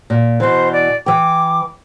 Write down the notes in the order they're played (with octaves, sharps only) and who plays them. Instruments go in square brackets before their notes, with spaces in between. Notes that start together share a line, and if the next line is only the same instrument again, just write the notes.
[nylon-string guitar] A#2
[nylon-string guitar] B2 E3 [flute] C5
[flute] D5
[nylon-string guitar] E3 G5 [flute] D6